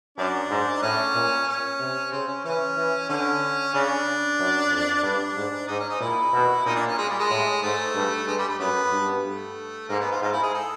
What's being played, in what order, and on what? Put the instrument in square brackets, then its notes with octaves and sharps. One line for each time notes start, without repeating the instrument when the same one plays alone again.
[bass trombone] F#2 [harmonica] D4
[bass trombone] G#2
[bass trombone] A2 [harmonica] C#4
[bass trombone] A#2
[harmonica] C#4
[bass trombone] C3
[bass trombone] C#3 [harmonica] C4
[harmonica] C#4
[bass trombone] E3 [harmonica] C#4
[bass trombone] E3
[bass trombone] D3 [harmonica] C#4
[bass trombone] C#3 [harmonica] D4
[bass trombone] F#2
F2
[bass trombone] G2 [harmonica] D4
[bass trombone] G#2
[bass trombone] G#2 [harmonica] D#4
[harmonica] C#4
D#4
[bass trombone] A#2 [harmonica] E4
[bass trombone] B2
[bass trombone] A#2 [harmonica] D#4
[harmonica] D4
C#4
G#3
G3
G#3
[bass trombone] A2
[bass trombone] G#2 [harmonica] A3
[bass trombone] G2
[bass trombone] G2 [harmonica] G#3
[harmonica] G3
A3
[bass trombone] F#2 [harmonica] B3
[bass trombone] G2
[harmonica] A3
[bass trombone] G#2 [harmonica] A#3
[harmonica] B3
F4
[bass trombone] G#2 [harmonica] F4
[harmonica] E4
G#4
A4